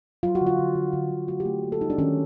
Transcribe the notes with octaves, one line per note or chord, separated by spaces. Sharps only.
F#3 F4
F#4
D3
F4
D3
D3
D3
D3
A3 F#4
G4
A3
A#3
A4
G3 D#4
D4
D#3 C#4